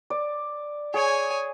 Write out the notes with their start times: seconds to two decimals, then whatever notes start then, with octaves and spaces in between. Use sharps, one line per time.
0.10 D5
0.94 G#4 C#5 G#5